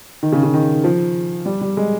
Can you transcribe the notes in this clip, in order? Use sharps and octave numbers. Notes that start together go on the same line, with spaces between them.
D#3
C#3
C#3
D#3
F3
G3
G3
G#3